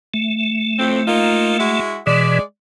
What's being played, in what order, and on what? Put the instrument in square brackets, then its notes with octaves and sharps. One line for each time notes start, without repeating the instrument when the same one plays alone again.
[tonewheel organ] A3
[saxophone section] F2 A2 C4
A#3 D#4 F4
G#3 E4 F#4
[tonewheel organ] B2 E3 [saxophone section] G#3 D5